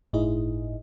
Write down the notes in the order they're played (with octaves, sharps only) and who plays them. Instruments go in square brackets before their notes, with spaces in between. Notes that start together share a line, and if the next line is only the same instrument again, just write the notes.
[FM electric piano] G1 A2 D#4 E4 G#4 D#5